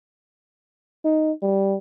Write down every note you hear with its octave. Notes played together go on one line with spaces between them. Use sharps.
D#4
G3